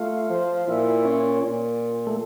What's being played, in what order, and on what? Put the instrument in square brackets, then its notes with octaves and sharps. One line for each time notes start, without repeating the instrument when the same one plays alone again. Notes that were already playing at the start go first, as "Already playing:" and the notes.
Already playing: [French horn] A3 [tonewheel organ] F4
[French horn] F3
[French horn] A#2 [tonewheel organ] E4
[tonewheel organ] C#4
[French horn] A#2
[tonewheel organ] A3